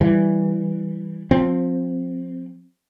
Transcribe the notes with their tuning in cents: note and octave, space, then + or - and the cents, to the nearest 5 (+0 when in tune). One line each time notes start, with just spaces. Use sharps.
E3 +0 G3 +0
F3 +25 C4 +5